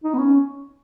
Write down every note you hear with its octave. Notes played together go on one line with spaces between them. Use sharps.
D#4
B3
C#4